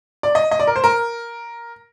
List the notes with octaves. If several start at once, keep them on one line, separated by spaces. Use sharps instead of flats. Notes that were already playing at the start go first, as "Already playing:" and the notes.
D5
D#5
D#5
D5
A#4
C5
A#4